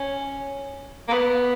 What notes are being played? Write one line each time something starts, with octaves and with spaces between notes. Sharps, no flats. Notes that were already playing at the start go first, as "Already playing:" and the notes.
Already playing: C#4
A#3
B3